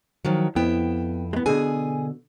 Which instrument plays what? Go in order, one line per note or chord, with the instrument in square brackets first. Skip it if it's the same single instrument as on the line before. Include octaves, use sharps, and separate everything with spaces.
[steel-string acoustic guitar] D#3 F3 F#3
[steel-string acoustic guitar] F2 E4 G5 [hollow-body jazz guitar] B3
[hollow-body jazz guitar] G#3 B3
[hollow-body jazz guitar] B2 D3 [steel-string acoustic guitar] G#4 G#5